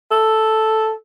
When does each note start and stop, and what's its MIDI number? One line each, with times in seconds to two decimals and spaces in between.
0.11 0.92 69